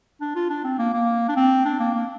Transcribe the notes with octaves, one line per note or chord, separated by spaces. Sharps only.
D4
F4
D4
C4
A#3
A#3
D4
C4
D4
A#3
A#3